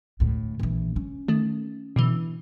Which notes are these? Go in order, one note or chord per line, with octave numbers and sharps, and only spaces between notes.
D2 A2
A#1 E3
C#4
D#3 A3
B2 D3 E3